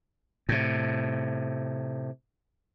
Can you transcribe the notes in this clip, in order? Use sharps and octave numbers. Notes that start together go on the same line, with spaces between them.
A2 C3